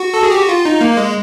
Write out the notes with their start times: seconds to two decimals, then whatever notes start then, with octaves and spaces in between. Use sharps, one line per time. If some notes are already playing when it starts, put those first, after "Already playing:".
Already playing: F#4
0.14 A4
0.23 G#4
0.31 G4
0.41 F#4
0.49 F4
0.65 D#4
0.81 A#3
0.97 G#3